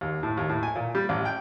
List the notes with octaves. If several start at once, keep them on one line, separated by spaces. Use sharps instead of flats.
D#2
A2
D#2
A2
G#5
A#2
G3
A1
G5